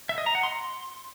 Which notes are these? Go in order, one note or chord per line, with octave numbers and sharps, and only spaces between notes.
E5
D#5
A#5
F#5
C6